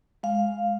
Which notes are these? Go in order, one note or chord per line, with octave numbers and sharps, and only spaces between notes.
G#3 F5